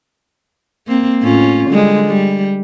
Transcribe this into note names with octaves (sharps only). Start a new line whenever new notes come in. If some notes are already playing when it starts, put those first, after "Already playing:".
A#3 C4
A2 C#4 F4
D3 G3 G#3
G3